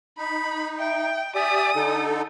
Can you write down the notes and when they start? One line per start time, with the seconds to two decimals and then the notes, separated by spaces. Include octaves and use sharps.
0.18 D#4 B5
0.79 E5 G5
1.35 G4 D5 E5 G#5 D#6
1.76 D3 D#4 A4